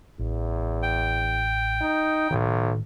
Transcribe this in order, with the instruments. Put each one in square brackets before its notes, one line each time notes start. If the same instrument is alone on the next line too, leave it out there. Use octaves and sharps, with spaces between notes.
[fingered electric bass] A1 [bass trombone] E2
[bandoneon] G5
[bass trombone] D#4
[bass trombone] B1 [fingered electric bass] A2 D#3